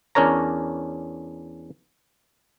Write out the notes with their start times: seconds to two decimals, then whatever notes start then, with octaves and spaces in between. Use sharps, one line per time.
0.15 E2 C#4 D4 A#4 C#5 A#5